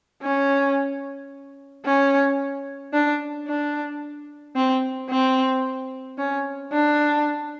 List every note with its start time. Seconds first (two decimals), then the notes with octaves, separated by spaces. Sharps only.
0.22 C#4
1.85 C#4
2.93 D4
3.47 D4
4.55 C4
5.10 C4
6.18 C#4
6.72 D4